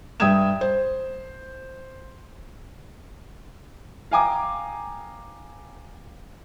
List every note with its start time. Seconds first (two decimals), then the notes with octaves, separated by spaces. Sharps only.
0.20 G2 E5 G5 D#6 G#6 E7
0.61 C5
4.11 F5 G5 G#5 A#5 D6 D#6